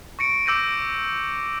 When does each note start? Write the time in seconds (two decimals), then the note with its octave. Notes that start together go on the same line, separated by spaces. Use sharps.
0.19 C#6 A#6 C#7 D7
0.46 D6 E6 G6 A#6 C#7 D#7